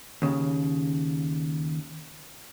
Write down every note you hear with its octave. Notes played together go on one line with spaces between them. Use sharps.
D#2 C#3